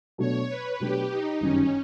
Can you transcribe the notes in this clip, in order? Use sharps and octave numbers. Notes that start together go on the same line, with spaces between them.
B2 F#3 A3 D4 C#5
B4
B2 F#3 A3 D4 G4
D#4
G1 F#2 D#3 G3 C#4